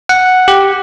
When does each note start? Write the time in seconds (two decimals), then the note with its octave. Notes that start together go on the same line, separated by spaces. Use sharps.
0.09 F#5
0.48 G4